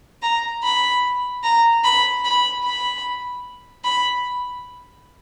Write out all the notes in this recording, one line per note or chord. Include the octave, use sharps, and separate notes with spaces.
A#5
B5
A#5
B5
B5
B5
B5